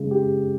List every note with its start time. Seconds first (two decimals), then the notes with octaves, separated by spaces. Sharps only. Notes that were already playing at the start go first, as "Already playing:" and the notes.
Already playing: C#3 G#3
0.11 G4